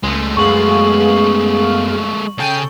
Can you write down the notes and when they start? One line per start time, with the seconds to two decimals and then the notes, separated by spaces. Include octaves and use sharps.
0.03 C#2 G#3 A3
0.37 F#2 B3 G#4 F5 C#6 F#7
2.39 C#3 A4 G5 G#5 G6